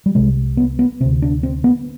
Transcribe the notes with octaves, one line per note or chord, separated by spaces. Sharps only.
G3
C2 C3 G#3
B3
B3
D2 C3 C4
D4
C4
B3